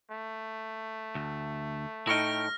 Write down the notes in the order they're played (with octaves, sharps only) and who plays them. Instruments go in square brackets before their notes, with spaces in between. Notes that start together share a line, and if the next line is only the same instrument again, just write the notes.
[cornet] A3
[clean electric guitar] D2
[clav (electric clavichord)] A2 D#4 [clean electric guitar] E4 C#5 G5 [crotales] F6 A#6